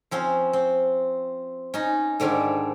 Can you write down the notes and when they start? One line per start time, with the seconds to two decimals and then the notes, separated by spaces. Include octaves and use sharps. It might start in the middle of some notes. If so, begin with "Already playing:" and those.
0.11 F3 C4 C#4
0.53 C4
1.74 C#4 D#4
2.20 G#2 D3 D#3 C#4 D4